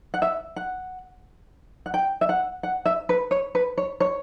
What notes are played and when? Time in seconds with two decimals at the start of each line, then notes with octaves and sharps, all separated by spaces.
0.14 F#5
0.22 E5
0.56 F#5
1.86 F#5
1.94 G5
2.21 E5
2.29 F#5
2.63 F#5
2.86 E5
3.09 B4
3.31 C#5
3.55 B4
3.78 C#5
4.00 C#5